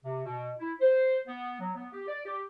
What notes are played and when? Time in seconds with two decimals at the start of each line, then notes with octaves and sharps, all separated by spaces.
0.04 C3
0.25 B2
0.59 E4
0.81 C5
1.27 B3
1.60 F#3
1.75 B3
1.93 G4
2.08 D5
2.26 G4